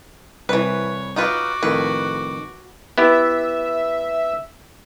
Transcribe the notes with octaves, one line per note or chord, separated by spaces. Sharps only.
C2 E3 B4 C#5
D#4 F4 F#4 B4 D6
F2 A2 D#3 B4
B3 E4 G4 E5